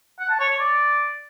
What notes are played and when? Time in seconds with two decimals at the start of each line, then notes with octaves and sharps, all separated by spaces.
0.20 F#5
0.30 A5
0.40 C#5
0.50 C#5
0.60 D5